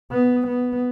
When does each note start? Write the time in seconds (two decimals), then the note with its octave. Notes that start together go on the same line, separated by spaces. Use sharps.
0.12 B3
0.47 B3